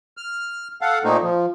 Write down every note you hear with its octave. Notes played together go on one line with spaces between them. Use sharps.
F6
A4 F5 F#5
A#2 A3 A#3 C4 D#4
F3